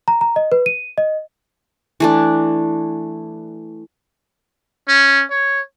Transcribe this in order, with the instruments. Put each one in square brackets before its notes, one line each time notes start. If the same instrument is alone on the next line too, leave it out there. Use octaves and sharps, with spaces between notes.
[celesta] A#5
A#5
D#5
B4
D#7
D#5
[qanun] E3 A3 D4
[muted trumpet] C#4
C#5